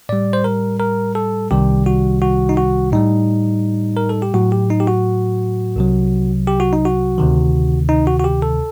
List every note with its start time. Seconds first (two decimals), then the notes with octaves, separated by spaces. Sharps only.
0.09 A2 G3 D5
0.33 C5
0.44 A#4
0.80 A#4
1.15 A4
1.51 C2 C3 D#3 G3 G4
1.86 F#4
2.22 F#4
2.49 D#4
2.57 F#4
2.92 A2 G3 D#4
3.97 A#4
4.09 A4
4.22 G4
4.34 A2 F#3 F#4
4.52 G4
4.70 D#4
4.80 G4
4.87 F#4
5.76 C2 C3 F#3
6.47 G4
6.60 F#4
6.73 D#4
6.85 F#4
7.18 D2 C3 D#3
7.89 D#4
8.07 F#4
8.20 F#4
8.24 G4
8.42 A4